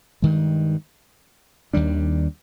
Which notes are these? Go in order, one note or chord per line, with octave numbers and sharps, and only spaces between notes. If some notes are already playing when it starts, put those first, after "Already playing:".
G2 D#3 G#3
D#2 D#3 G3 D4